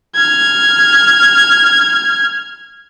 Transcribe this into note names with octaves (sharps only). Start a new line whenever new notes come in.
F6 G#6